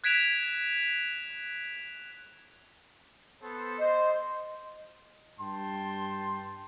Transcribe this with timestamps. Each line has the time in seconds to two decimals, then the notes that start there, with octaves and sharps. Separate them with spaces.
0.04 F#6 G#6 B6 D7 E7 F7
3.42 B3 A4 C5
3.79 C5 D#5 C6
5.39 G2 G5 A5 C6